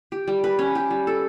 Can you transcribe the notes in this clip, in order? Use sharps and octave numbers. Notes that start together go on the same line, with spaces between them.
G4
G3
B4
C#4
G4
G3
A4